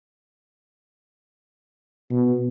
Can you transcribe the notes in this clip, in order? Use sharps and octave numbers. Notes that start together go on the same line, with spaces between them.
B2